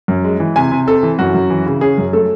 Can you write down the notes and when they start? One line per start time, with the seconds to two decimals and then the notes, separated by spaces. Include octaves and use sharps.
0.08 F#2
0.24 G#3
0.40 E3
0.56 C3 G#5
0.71 C3
0.87 C4 A4
1.03 E3
1.19 F#2 F#4
1.35 F#2
1.50 E3
1.66 C#3
1.81 C#4 G#4
1.98 F#2
2.13 A3 A4